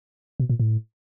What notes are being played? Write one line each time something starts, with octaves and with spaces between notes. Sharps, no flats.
B2
A#2
A2